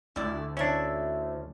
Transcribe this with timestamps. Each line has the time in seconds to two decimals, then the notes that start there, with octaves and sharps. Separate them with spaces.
0.16 D2 E4 D5
0.57 C#4 D4 E4 E5